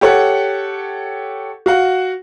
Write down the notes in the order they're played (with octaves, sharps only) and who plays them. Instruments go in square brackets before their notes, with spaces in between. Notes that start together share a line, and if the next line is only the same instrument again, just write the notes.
[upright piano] G4 A4 C#5 F#5
F#4 F5 F#5